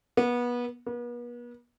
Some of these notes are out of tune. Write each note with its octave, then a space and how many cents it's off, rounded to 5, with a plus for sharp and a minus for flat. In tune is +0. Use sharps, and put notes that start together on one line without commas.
B3 -25
B3 -40